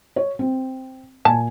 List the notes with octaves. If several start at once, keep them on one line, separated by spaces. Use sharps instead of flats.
C#5
C4
A#2 G#5 A5